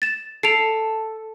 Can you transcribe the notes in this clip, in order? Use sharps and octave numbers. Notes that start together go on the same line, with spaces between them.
A6 E7
A4 C7 D7 F7